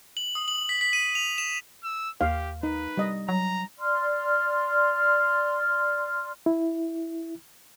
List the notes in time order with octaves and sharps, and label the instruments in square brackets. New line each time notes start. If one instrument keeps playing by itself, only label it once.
[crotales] F#7
D#6
F#7
B6
B6
D#7
F7
E7
[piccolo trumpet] E6
[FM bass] D#2 [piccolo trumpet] G4 [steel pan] F5
[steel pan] D#4 [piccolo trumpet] B4
[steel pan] G3 D#5
[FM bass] F#3 [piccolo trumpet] A#5
[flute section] D5 C6 F6
[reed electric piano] E4